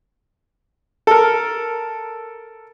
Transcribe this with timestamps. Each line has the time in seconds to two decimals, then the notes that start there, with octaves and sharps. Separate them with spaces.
1.07 A4 A#4